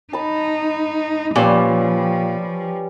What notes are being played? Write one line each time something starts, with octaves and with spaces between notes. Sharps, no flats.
D#4 A5 B5
A#2 F3 G3 C#4 B4